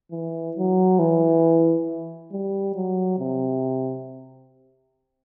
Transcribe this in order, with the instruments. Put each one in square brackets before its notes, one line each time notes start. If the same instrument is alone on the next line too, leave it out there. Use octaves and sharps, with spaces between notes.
[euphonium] E3
F#3
E3
G3
F#3
C3